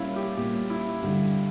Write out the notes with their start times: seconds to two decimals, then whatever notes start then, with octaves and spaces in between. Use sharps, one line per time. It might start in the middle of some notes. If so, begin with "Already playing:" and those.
Already playing: A#2 G3 A#3 C#4 E4 F4
0.16 G4
0.37 A#2 G3 A#3 C#4 G4
0.70 E4
1.02 G2 D3 G3